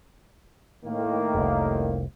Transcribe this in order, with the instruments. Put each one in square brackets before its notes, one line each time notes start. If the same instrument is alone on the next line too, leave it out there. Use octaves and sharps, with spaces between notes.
[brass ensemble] A2 D#3 A#3
[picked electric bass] F1 C2